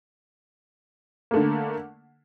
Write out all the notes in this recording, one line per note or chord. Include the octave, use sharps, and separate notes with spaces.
D3 A3 A#3